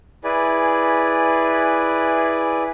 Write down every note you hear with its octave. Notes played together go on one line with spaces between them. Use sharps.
E4 G#4 B4 D5 G#5